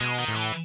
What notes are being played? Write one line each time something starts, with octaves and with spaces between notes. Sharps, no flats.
B2 G#3
D#3
A2
E3